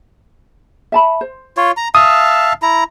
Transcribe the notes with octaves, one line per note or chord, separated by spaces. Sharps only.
E5 A5 B5
C5
F4 C#5
A#5
E5 F5 A5 D#6
E4 A#5